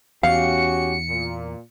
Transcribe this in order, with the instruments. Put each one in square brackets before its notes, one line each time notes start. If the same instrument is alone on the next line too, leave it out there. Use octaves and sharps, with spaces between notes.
[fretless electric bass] E2 [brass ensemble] C#4 F#4 G4 [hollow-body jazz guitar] F5 [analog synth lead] C#7
[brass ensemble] A#2